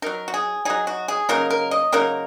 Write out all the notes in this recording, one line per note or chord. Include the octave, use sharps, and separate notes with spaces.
F#3 D#4 A#4
F#4
G#4
F#3 D#4 G#4
F#4
G#4
C#3 F#3 A#3 D#4 A#4
A#4
D#5
C#3 F#3 A#3 D#4 A#4